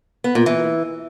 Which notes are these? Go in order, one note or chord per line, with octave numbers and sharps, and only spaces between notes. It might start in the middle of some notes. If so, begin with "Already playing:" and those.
B3
A#2
E3